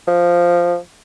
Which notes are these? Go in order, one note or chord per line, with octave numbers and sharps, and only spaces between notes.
F3